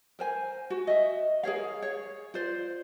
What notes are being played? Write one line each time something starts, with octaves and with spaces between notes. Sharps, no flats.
A#4 C5 G#5
F#4
D#5 E5
G#4 A#4 C#5 F5
C#5
F4 C5 D5